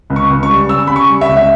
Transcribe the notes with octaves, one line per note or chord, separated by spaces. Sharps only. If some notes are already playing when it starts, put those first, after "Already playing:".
C#2
C#6
C#2
C#6
G3
C#3 E6
C#3 B5
C#6
G3
E5
C#2
E5